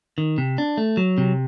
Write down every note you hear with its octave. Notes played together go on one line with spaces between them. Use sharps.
D#3
C3
D4
A3
F#3
C3